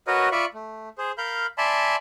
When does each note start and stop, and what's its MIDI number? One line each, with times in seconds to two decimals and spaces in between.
0.07 0.29 66
0.07 0.29 70
0.07 0.29 71
0.07 0.29 73
0.07 0.29 75
0.32 0.45 65
0.32 0.45 74
0.32 0.45 76
0.32 0.45 83
0.32 0.45 85
0.54 0.89 57
0.98 1.12 68
0.98 1.12 72
1.18 1.46 70
1.18 1.46 77
1.18 1.46 83
1.18 1.46 91
1.58 1.96 74
1.58 1.96 76
1.58 1.96 80
1.58 1.96 81
1.58 1.96 83
1.58 1.96 84